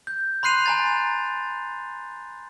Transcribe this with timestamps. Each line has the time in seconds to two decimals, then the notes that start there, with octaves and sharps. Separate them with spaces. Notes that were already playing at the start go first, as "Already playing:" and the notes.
0.07 G6
0.43 B5 C6 F#6 C7 D#7 F7
0.66 G#5 A#5 A6